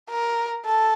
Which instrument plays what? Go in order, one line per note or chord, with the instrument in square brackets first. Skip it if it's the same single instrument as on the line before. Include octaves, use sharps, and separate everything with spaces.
[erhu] A#4
A4